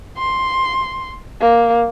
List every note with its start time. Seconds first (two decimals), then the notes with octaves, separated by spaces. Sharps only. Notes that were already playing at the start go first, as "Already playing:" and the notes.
0.18 C6
1.40 A#3